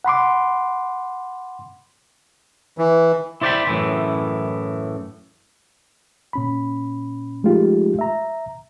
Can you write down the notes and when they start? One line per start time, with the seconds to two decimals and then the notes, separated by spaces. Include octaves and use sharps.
0.05 F#5 B5 C6 D6
2.78 E3
3.42 E4 C5 D5 F#5 G5 B5
3.67 F#2 A2 E3
6.33 A#2 C#4 B5
7.44 F3 G#3 A3 D#4 F4 G4
7.99 E5 A#5